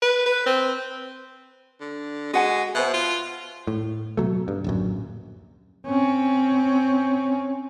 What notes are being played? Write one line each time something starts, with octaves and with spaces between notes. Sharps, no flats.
B4
B4
C4
D3
G#3 F#4 F#5 G#5
B2 C5 E5
F4
A2
B2 E3 F#3 A3
G2
D1 A#1 F#2
C4 C#4